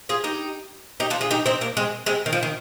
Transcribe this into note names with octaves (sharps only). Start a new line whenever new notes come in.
F4 G#4
D#4 G4
D#4 G4
D4 F4
F4 G#4
D#4 G4
C4 D#4
A#3 D4
G#3 C4
G#3 C4
D#3
F3
D#3